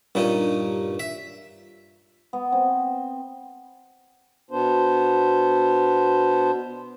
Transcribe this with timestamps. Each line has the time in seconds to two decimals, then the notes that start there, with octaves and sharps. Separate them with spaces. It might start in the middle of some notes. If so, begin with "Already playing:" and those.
0.15 G2 A#2 C#4 D#4
1.00 E5
2.33 B3
2.52 C4
4.51 B2 B3 D4 C5